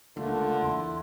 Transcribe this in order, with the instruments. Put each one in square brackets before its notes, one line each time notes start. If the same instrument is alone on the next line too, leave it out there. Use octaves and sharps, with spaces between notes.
[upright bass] C#2 [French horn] D3 [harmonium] A3 A#3 F4
[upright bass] E2 [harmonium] E4 [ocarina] C6